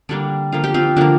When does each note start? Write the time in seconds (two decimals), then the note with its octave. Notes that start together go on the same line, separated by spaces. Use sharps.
0.09 D3 G3 A#3 D4
0.52 D3 F3 A#3 F4
0.64 G4
0.74 C4 F4
0.96 D3 F3 A#3 D4